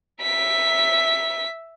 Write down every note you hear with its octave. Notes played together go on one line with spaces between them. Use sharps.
E5 B6